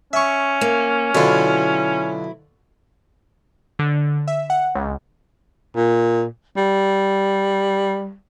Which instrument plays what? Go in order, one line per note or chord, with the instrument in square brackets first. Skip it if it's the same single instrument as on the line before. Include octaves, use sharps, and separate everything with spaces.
[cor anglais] C#4 [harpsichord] E5 C#6
[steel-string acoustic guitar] A#3
[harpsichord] B2 D3 F4 [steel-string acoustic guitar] F#3 E4
[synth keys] D3
E5
F#5
C#2
[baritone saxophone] A#2
G3